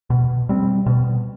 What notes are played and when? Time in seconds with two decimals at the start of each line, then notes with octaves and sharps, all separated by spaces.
0.10 B2
0.49 G3 C4
0.86 B2